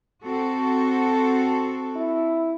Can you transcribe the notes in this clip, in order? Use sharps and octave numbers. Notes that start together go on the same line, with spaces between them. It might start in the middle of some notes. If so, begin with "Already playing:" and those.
C4 F#4 A4
E4